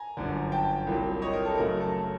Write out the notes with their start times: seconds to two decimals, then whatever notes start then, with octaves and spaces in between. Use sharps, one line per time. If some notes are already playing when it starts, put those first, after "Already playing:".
Already playing: G#5 A#5
0.17 G1 F#2 D3
0.52 G5 A5
0.87 C2 A#2 F#3
1.22 C#5 D#5
1.33 A#4
1.45 A4
1.57 F#2 C#3 F#3 A3 A#4
1.80 A4
1.92 A4